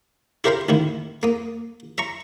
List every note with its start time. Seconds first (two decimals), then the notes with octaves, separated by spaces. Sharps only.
0.44 E4 G4 A#4 C5 E5 F5
0.69 A1 D#3 E4
1.23 A#3 D#6
1.98 E5 A#5 C#6